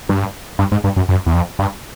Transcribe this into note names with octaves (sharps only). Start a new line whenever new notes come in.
G2
G2
G#2
G2
F#2
F#2
E2
F2
G2